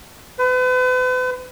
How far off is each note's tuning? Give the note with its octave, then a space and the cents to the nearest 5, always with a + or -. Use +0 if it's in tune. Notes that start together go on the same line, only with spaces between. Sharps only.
B4 +40